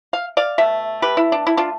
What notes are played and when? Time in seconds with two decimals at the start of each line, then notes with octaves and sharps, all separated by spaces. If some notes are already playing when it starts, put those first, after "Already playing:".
0.13 F5
0.37 D5 F5
0.58 B2 A3 E5
1.02 G4 B4
1.17 E4
1.32 D4
1.47 E4
1.57 D4 F4